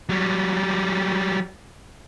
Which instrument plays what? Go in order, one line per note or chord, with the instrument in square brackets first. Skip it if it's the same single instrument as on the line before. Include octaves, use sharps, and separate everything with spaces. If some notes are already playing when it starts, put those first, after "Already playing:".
[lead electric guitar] F#3 G3